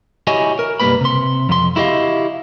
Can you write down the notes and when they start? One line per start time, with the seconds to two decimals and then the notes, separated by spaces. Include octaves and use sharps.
0.27 E4 F#4 G4 C#5 D#5 G#5
0.59 A#4
0.80 B1 F#2 G3 A#3 B4 B5
1.01 C3 C6
1.49 F2 C6
1.76 E4 F#4 G4 D#5 F5